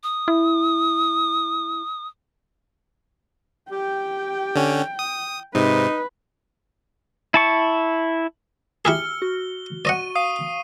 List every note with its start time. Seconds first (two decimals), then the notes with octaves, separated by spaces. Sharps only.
0.03 D#6
0.28 E4
3.71 G4 G5
4.56 D3 C#4
4.99 D#6
5.55 G#2 C3 D#4 B4
7.34 E4 A5 C#6
8.85 E4 G4 G#4 E6 F6 C#7 G7
9.22 F#4
9.85 D5 D#5 F#5 C#6 D#7
10.15 F5 D#6 C7 D#7